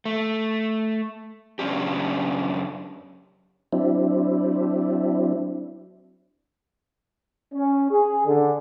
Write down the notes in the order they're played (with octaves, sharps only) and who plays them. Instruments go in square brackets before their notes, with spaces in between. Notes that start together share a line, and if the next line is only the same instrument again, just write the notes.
[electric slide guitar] A3
F#2 C#3 C#4 D4 G4
[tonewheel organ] F#3 C4 D4 E4
[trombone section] C#4
G#4
D3